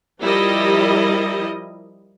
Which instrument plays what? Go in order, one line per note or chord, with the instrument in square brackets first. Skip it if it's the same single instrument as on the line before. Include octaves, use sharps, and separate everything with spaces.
[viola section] F3 G3 E4 A#4 D#5